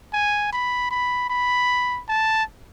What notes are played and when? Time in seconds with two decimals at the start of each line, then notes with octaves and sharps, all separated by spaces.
0.13 G#5
0.53 B5
0.90 B5
1.30 B5
2.08 A5